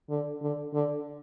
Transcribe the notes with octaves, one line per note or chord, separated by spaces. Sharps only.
D3
D3
D3